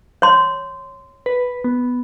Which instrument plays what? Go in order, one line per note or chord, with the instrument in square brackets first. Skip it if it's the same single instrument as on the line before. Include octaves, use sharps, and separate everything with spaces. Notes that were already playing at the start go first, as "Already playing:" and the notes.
[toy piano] C#5 C6
[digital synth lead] B4
B3